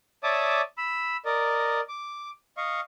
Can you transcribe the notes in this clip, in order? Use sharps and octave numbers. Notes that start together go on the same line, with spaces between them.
C#5 D5 E5 A5 D6 D#6
B5 E6
A#4 D5 D#5
D6
D#5 F5 C#6